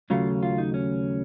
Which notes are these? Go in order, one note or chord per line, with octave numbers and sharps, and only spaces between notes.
D#2 C#3 F#3 A3 C#4 F4
F4
D#4
C#4